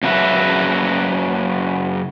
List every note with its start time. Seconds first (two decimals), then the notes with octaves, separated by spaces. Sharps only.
0.03 F#2 C#3 F#4 B4 E5